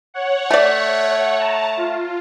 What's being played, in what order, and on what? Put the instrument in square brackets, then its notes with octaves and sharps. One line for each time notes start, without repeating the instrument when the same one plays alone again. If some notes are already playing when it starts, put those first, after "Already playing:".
[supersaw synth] C#5 F#5
[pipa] A3 D5
[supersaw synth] A5 A#5
F4